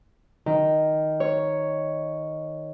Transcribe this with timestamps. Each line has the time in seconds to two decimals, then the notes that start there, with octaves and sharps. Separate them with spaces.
0.46 D#3
1.20 C#5